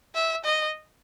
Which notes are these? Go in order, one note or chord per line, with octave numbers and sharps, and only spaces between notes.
E5
D#5